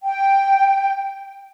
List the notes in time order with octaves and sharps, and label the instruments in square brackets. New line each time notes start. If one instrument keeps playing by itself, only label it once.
[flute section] G5